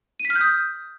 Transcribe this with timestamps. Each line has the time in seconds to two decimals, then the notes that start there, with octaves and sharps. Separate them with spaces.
0.20 D#7
0.25 B6
0.30 F6
0.35 G6
0.41 D#6